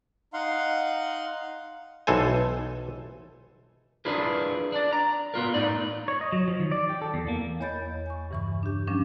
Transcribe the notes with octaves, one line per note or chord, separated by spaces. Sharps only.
D#4 F5 F#5 C6
B1 E3 A4 C5 G#5
D4 E4 F4 G#4 A#4 B4
D4 D5
A#5
B3 F4 A#4
A2 D#4 D5
C#5
D#5
F#3
F3
D#3
D5
G4
A4
E2
A#3
E2 C#5 D#5 B5 G6 A6
G#5 C#6
G2 C#3 E3 B5 C#6
D4 G4
E2 C#3 F3 G3 C#4 D4